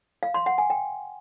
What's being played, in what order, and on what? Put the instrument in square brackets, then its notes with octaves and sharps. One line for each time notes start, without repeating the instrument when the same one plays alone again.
[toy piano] F5
C6
F#5
G#5
G5